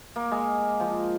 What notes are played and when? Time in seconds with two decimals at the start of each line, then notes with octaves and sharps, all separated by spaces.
0.16 A#3
0.31 G#3
0.80 F3